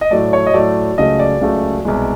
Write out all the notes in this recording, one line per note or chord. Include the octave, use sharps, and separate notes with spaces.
D#5
A2 F#3 A3 D5
C#5
D#5
A2 F#3 A3 D5
C#2 C#3 F#3 A3 D#5
D5
C#2 C#3 F#3 A3
C2 B2 G#3